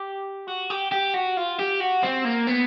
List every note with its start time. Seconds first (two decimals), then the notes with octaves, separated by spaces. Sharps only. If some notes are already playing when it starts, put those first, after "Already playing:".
Already playing: G4
0.48 F#4
0.70 G4
0.92 G4
1.14 F#4
1.37 F4
1.59 G4
1.80 F#4
2.03 C4
2.25 A#3
2.47 B3